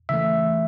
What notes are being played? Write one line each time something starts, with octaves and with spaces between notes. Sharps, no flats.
C#3 E3 A3 E5